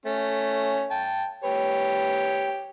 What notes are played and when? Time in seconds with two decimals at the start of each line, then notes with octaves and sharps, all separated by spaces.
0.06 A3 C#4
0.91 G5 A5
1.44 G4 B4 C#5